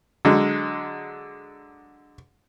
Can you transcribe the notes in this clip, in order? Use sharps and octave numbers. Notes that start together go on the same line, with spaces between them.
D3 F#3 G#3